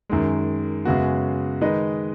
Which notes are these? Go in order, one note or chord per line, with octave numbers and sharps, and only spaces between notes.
F#2 D#3 G#3
F#2 C#3 G#3 B3 F#4
D#3 G#3 D#4 B4 D#5